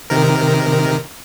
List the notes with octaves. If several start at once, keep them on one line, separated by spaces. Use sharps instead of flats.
C3 D#3 A#4